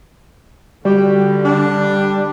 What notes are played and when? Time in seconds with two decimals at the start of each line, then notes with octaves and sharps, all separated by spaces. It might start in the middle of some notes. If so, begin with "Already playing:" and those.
0.85 D3 G3 F#4 G4
1.45 D4